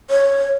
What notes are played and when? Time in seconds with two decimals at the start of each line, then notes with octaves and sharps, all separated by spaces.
0.10 C#5